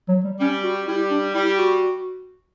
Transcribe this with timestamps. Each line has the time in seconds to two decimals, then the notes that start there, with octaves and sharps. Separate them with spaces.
0.09 F#3
0.24 G3
0.40 G3 C#4
0.64 F#4
0.87 G3 E4
1.11 D4
1.34 G3 E4
1.58 F#4